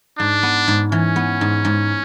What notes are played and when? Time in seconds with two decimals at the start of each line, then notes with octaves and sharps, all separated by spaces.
0.18 G#2 D4
0.43 B3
0.68 G#2
0.92 E3 C#4
1.16 B3
1.41 G#2
1.65 G#2